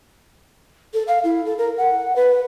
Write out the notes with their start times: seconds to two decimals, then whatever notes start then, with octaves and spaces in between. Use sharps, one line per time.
0.94 A4
1.07 F5
1.24 E4
1.45 A4
1.58 A#4
1.77 F#5
2.16 B4